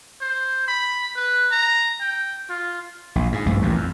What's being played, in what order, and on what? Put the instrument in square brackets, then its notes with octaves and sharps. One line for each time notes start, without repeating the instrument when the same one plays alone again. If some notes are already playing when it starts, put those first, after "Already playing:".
[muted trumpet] C5
B5
B4
A#5
G5
F4
[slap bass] A#1
G#2
A#1 G2 A3
A1 D#2 A#2
F2